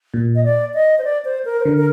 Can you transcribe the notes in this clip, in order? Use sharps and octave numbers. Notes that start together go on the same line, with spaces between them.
A#2
D#5
D5
D#5
C5
D5
C5
A#4
C5
D3 A#4
A#4